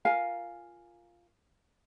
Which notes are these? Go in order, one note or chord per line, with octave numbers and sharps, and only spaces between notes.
F4 A#4 F5 G#5